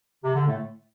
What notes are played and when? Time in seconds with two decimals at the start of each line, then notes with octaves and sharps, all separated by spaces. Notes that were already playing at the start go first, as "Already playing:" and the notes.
0.24 C3
0.35 D3
0.47 A2 A3